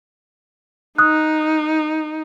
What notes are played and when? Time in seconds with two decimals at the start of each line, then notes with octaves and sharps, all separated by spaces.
0.98 D#4 D#6 F#6